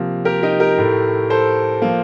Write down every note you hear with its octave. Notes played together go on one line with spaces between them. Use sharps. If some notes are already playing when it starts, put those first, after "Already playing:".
Already playing: C3 F3 A#3
G4 A#4
D#4 G4
G4 A#4
A2 A3
A4 C5
F3 A#3